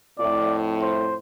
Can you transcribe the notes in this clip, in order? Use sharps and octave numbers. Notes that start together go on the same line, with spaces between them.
F2 A2 D5
C5